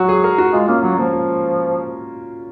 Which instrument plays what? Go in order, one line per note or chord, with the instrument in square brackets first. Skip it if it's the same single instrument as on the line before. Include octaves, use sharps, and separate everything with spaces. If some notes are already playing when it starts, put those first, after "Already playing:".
Already playing: [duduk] F#3 [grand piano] F#4
[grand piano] G#4
A#4
F#4
[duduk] G#3 [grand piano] F4
[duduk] A#3 [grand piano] C#4
[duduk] F#3 [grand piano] A#3
[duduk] F3 [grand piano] A#3
[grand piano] F4